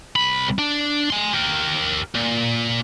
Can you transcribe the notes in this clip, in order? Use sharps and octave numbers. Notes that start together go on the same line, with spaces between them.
C2 B5
D4
G#5 C6
G4 A#4
A#2